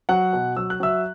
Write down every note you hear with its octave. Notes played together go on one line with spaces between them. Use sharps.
F#3 F#5 F#6
B2
F#3 E6
F#6
F#3 E5 E6